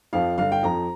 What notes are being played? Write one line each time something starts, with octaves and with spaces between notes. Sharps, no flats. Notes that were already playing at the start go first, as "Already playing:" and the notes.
F2 F3 F5
G1 F5
G5
F2 F3 A#5